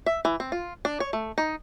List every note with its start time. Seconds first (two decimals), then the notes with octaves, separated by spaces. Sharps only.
0.06 E5
0.25 E3
0.40 C4
0.52 F4
0.85 D4
1.00 C#5
1.13 A3
1.38 D#4